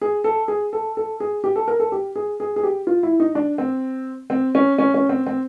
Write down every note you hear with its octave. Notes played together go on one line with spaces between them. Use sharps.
G#4
A4
G#4
A4
A4
G#4
G4
A4
A#4
A4
G4
G#4
G#4
G#4
G4
F4
E4
D#4
D4
C4
C4
C#4
C#4
C#4
C4
C4